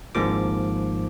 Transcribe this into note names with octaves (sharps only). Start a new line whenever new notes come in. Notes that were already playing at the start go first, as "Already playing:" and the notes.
G#1 G#2 F3 A#3 D6